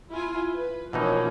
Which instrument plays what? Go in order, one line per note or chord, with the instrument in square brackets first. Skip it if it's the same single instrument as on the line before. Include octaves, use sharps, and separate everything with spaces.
[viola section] E4 F4 G#5
B4
[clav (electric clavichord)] B2 E3 D#4 [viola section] F3 A#3 C#4